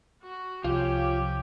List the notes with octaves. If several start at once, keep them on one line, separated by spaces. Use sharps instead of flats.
F#4
C2 F3 C#4 F4 G4